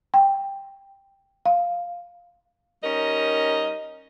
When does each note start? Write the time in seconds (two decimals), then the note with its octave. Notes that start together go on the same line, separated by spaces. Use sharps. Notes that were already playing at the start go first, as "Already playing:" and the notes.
0.14 G5
1.45 F5
2.84 G3 C#4 D#4 A#4 D#5